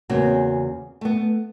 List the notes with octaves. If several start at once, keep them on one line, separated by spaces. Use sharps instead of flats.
E2 C#3 A#3 C4 F#4
A3 B3